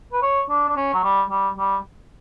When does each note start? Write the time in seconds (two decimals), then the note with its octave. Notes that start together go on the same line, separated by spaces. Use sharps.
0.12 B4
0.22 C#5
0.49 D4
0.69 D4
0.76 C#4
0.94 F#3
1.03 G3
1.30 G3
1.58 G3